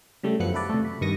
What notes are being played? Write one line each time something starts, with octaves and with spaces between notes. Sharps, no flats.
C#3 G3 A3
F#2 F3 B3 D4 F#6 C#7
E4 A4 B4 D5
C3 A3
B5
G2 D#3 C#6 D#6 A#6